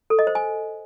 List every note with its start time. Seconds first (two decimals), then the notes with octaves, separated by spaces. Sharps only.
0.10 A4
0.19 D#5
0.27 C5
0.35 G#5